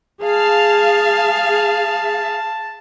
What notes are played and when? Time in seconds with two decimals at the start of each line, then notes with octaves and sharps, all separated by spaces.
0.23 G#4 F5 A5